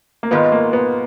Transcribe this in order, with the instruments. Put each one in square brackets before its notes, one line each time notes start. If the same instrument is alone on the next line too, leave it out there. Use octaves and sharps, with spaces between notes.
[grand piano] A#3
[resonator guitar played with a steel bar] G#2 D#3 G#3 F4 [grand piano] B3
[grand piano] A#3
B3